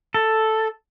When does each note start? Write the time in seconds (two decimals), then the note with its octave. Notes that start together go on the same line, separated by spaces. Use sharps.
0.14 A4